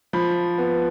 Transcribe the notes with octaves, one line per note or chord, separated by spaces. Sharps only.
F3 B5
B3